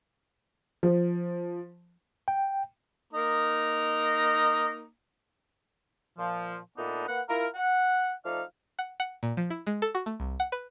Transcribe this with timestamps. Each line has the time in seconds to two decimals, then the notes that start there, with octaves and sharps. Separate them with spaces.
0.83 F3
2.28 G5
3.13 A#3 D#4
6.18 A#2 F3
6.77 A#2 A3 B3 D4 D#4
7.08 A#3 B4 F#5
7.29 E4 F4 A#4
7.55 F#5
8.25 F3 A3 D#4 D5 F5
8.79 F#5
9.00 F#5
9.23 A#2
9.37 F3
9.50 E4
9.67 G#3
9.82 A4
9.95 F#4
10.06 A3
10.20 C2
10.40 F#5
10.52 B4